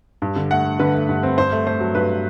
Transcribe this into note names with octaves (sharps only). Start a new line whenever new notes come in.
G2
D3
A3 F#5
A3
D3 B4
A3
G2
C4
G2 C5
A3
A3 C5
F#3
G2 B4